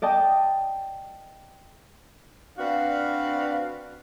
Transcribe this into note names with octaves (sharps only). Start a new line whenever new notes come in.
D5 D#5 G5 A5
C4 D4 F#4 B4 D5 F5